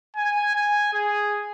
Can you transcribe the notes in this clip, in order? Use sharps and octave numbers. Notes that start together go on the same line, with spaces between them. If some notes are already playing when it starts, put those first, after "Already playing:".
G#5
G#5
G#4